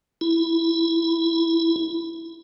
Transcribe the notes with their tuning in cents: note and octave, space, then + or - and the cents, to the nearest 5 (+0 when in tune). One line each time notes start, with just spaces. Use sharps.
E4 +5